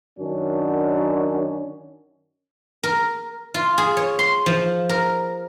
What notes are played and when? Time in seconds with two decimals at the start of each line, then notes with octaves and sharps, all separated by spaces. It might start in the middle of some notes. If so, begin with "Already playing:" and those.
0.18 F#2 D#3 C#4 D4
2.83 A#4
3.54 F4
3.78 G#4
3.97 C#5
4.19 C6
4.46 F3
4.89 A#4